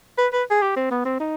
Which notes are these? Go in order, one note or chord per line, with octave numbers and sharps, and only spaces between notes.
B4
B4
G#4
G4
C4
B3
C4
D#4